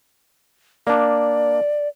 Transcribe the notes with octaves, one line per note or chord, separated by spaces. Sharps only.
A#3 D4 D5